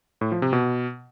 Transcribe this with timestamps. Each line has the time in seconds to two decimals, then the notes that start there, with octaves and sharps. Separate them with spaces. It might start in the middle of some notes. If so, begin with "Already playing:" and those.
0.21 A2
0.32 F3
0.42 C3
0.53 B2